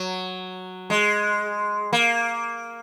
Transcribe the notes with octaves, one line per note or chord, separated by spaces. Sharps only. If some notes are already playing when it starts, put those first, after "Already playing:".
Already playing: F#3
G#3
A#3